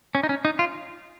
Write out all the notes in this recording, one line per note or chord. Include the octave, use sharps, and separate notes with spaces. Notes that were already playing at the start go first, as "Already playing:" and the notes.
C#4
D#4
C#4
D#4
F4